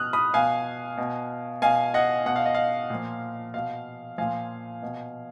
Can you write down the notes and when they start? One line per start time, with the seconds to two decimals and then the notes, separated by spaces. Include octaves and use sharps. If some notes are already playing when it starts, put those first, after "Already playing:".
Already playing: B2 D#6 F6 F#6
0.13 B5 D#6
0.34 B2 F5 G#5
0.97 B2
1.62 B2 F5 G#5
1.94 D#5 F#5
2.26 B2 F#5
2.36 F5
2.46 D#5
2.54 F5
2.90 A#2
2.95 F3
3.54 B2 F5
4.18 A#2 F3 F5 G#5
4.82 B2